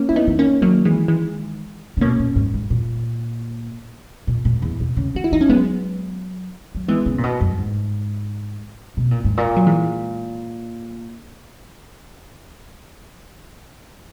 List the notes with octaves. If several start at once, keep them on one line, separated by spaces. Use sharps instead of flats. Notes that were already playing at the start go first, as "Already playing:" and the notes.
Already playing: A#3 C#4
E3 E4
B3 D#4
D#3
A#3 C#4
D#3 F#3 A#3
E3 G#3
E3 G#3
C#3
B2 A#3 C#4
A#2
G#2
G#2
A#2
A#2
A#2
E2
B2
C#3
D#3 F#4
E4
E3 D#4
C#4
F#3 G#3 B3
F#3
E3 G#3 B3
C#3
A#2
B2
F#2
G#2
B2
A#2
G#2
A#2
F#3
E3 G#3